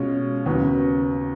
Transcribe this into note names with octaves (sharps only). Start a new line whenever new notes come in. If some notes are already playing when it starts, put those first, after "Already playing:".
Already playing: B2 G#3 C#4 F4
D#2 C#3 F#3 B3